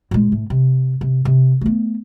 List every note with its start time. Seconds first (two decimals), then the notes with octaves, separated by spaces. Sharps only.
0.11 A#2 G#3
0.32 A2
0.50 C3
1.01 C3
1.25 C3
1.61 A3 B3